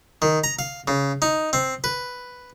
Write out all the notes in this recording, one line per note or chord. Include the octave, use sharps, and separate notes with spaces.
D#3
A#5
F5
C#3
D#4
C4
B4